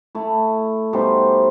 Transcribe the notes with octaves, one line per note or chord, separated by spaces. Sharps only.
A3 E4
B2 G3 D#4 C5